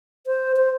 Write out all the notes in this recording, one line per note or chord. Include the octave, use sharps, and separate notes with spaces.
C5
C5